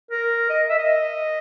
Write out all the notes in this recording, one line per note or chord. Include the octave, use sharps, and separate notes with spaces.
A#4
D#5
E5
D#5